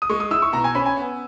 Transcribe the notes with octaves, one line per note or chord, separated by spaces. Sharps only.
D#6
G#3 C#6
D#6
E4 E6
C#6
B2 A#5
G#5
C#4 B5
G#5
B3